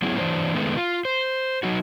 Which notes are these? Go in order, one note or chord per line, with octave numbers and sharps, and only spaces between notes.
F#3 B3 C#4 E4 G#4
E3 F#3 D4 A#4 C5
D#3 G#3 A3 B3
F4
C5
F#3 D#4 F#4